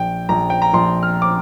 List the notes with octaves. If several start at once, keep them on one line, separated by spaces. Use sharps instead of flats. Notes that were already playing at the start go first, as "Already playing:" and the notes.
Already playing: A#1 G5
A#1 A#5
G5
A#5
A#1 C6
F6
D6